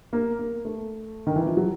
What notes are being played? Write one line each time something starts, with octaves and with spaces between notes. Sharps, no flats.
A#3
A#3
A3
D#3
E3
F3
F#3